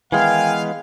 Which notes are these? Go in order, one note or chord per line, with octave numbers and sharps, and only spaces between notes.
D#3 E3 G#3 B3 F5 G5 G#5